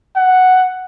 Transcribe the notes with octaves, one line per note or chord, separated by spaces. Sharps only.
F#5